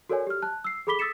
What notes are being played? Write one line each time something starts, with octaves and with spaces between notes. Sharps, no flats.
F#4 A4 A#4 C#5 D5 G#5
G4 F6
A5 F#6
E6 C7
G#4 A4 B5 D6 B6 G7
D#6 E6 A6 B6 C#7 E7